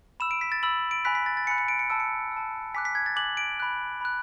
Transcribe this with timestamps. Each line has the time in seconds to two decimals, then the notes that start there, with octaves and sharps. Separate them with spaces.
0.20 B5 E6 E7
0.31 D7
0.41 B6
0.52 A6
0.63 B5 E6 F#7
0.91 D7
1.05 G#5 B5 F#6 B6
1.15 B6
1.26 A6
1.37 A6
1.47 G#5 B5 F#6 C#7
1.58 C#7
1.68 D7
1.79 C#7
1.90 A5 E6 D7
2.00 C#7
2.32 A5 E6
2.74 G#5 D6 F#6 B6
2.85 B6
2.95 G#6
3.06 A6
3.16 G#5 D6 F#6 F#7
3.37 D7
3.60 B5 F#6
4.01 B5 F#6